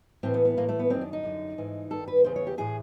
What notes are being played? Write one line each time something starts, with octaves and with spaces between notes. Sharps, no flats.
A2 E3 C4
B3
B3
A2 E3 A#3
A3
B3
F#2 D#3 C4
D4
D#4
F#2 D3
G#2 E3
G2 D#3 A4
B4
E2 C#3 E3 C5
C#5
G4
A2 E3 G#4